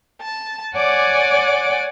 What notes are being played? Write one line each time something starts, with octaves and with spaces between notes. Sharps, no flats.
A5
C#5 D5 F#5 G#5 D6